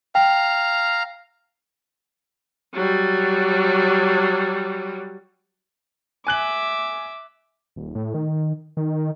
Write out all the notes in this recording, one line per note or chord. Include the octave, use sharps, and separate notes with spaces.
F5 G5 A#5
F#3 G3
E5 G#5 D6 F#6 F#7
D#1
A2
D#3
D#3